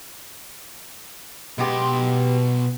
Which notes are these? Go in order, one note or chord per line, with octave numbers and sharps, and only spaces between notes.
B2 G#3 B3 G4 C6